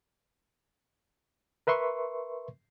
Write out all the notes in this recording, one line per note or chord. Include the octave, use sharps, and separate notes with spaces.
A#4 B4 E5 C6 C#6